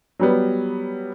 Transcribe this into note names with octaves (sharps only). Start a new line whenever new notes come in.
F#3 G3 B3